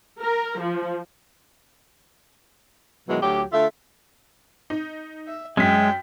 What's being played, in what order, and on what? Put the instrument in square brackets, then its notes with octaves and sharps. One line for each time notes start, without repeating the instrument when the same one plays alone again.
[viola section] A#4
F3
[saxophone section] B2 D#3 E3 F#3 G#3
D2 F#3 G4
D3 A3 F4 E5
[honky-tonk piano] D#4
[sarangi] E5
[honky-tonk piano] F#2 B6 [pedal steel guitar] G#3 [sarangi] G5